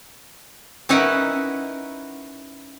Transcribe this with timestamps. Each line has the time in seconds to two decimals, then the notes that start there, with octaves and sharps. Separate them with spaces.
0.89 C#4 D#4 E4 A#4 B4 F#5